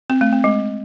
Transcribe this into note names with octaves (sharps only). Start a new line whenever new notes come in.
C4
A3
C4
G#3